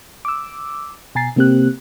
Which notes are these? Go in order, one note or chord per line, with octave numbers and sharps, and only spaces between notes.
D6 E6
B2 G#5 A#5 A6 C7
C3 A#3 C4 G4 F#6